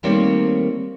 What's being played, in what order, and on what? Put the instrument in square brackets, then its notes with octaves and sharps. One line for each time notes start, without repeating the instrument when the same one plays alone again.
[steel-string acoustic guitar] D#3 G3 A3 A#3 C4 C#5